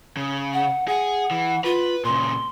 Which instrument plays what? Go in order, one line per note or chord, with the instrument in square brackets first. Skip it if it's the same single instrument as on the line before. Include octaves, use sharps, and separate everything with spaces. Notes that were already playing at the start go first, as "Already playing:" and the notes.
[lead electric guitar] C#3
[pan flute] F#5
[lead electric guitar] G#4 [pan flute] F#5
[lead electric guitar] E3
[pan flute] F4 [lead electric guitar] B4
[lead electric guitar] A#2 C#3 [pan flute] C6